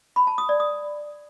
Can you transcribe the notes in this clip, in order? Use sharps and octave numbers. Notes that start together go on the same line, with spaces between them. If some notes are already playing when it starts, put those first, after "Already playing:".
B5
A5
D#6
D5
D#6